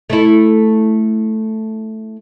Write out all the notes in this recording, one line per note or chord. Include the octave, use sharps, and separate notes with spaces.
A3 E4